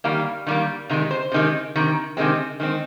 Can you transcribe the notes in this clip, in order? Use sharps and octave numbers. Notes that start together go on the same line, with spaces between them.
D#3 G3 A#3 F5
D#3 G3 A#3
C3 D#3 G#3
C5
C3 D#3 G#3
C3 D#3
C3 D#3 G#3 C4
D#3 G#3 C4